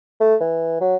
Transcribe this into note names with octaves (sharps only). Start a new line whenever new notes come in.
A3
E3
F#3